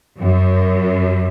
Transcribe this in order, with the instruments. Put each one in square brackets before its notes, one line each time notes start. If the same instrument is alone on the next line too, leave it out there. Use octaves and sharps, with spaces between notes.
[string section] F#2